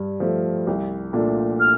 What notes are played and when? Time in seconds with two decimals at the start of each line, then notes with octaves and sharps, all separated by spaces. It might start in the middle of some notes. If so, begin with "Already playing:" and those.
Already playing: G2
0.20 F3 A3
0.67 C2
1.13 A#2 A3 D4 F4
1.60 F6